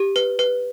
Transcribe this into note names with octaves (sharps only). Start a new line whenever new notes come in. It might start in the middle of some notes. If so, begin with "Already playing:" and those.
Already playing: G4
B4
B4